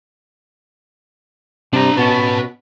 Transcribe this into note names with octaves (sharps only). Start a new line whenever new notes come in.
C3 G3 D4 A#5
B2 B3 C#4 B4 A5